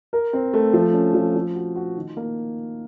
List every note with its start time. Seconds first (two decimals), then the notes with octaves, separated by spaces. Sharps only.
0.13 A#4
0.33 C4
0.53 A3
0.73 F3
0.94 C#4
1.14 F3
1.35 F3
1.55 F#4
1.76 F#4
1.96 D#3
2.17 A#3